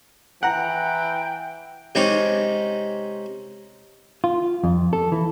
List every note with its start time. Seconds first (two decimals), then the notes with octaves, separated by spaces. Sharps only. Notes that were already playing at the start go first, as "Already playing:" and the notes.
0.43 E3 F#5 G5 A#5 F#6
1.95 C3 G#3 C4 C#4 D#4 D6
4.24 F4
4.64 F2
4.93 A4
5.12 E3